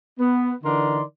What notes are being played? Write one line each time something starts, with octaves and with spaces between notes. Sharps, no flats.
B3
D3 E3 D#4 A#4 D5 C6